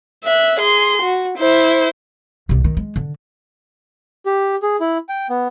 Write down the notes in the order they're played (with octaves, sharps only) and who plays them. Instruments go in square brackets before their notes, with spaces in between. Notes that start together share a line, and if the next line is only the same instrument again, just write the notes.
[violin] E5 F#6
G#4 C6
F#4
E4 C5
[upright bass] C2 C3
D#3
G#3
D3
[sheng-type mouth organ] G4
G#4
E4
G5
B3